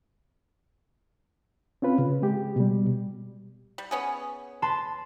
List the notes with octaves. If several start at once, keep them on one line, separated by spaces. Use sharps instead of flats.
C4 C#4 F4 B4
C#3
G#3 G4
B2 G3
G3
B3 C#4 G#4
B4 A5 C6